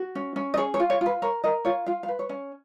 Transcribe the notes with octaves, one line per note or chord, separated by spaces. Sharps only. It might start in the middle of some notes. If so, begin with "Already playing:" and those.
Already playing: F#4
C#4
C#4
D#5
G#4 C#5
C#5
F4
C#5
F4 B4
A#4 C#5
A#4 D#5
F4 C#5
F4 F5
F5
B4
C#5
C#4